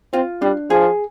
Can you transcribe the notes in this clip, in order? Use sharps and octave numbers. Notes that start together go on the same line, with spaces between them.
C4 F4
G3 D4
F3 G#4